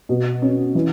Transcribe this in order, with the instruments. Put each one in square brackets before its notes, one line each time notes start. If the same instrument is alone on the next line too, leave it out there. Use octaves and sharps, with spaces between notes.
[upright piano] B2
C#4
E3